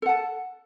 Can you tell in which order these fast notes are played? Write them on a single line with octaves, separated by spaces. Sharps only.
A4 F#5 A5